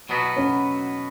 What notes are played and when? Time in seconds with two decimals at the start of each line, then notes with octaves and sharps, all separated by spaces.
0.09 B2 F#3 B3 F#4
0.36 C#4